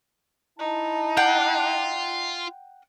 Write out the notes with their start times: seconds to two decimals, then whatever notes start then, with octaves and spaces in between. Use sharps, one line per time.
0.59 D#4 E4 A5
1.17 F4 F#5 G5